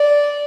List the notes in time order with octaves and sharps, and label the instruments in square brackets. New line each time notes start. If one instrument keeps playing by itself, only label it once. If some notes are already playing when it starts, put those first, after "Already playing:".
Already playing: [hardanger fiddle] D5